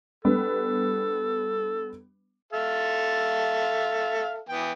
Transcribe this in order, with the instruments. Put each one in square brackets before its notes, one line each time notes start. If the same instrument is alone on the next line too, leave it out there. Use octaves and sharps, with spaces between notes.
[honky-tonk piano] G3 B3 D4 [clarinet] A4
[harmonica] A4 E5 F5
E3 B3 G5